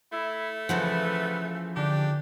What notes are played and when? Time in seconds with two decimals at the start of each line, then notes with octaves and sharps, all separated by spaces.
0.12 A3 E4
0.69 C#3 E3 F3 B4 F#5 G6
1.76 D3 D4 G4